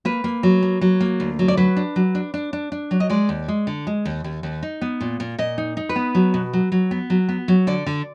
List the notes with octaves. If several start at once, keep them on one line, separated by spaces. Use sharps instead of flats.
A#3 B4
A#3
F#3
A#3
F#3
A#3
D2
F#3
D5
F#3 B4
D4
F#3
D4
D4
D4
D4
F#3
D#5
G#3 D5
D#2
G#3
D3
G#3
D#2
D#2
D#2
D#4
B3
A#2
A#2
A#2 D#5
D#4
D#4
B4
B3
F#3
B2
F#3
F#3
B3
F#3
B3
F#3
D3 D5
D3